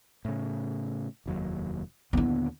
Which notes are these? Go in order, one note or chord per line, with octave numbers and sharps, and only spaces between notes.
A2 C#3
F1 D#2 F#3
D#2 A#2 D3 B3 E4